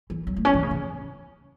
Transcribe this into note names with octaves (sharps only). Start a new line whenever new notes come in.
E3
F#3
A3
C#4
E3
C#3
E3